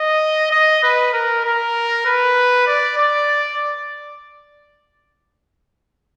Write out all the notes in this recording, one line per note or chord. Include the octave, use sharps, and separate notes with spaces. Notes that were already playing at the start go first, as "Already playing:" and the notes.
Already playing: D#5
D#5
B4
A#4
A#4
B4
D5
D5